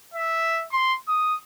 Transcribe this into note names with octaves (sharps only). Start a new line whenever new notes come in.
E5
C6
D#6